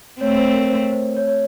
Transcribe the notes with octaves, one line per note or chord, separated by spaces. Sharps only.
A3 C4 C#5
C5
A#4
C5
C5
C#5
C#5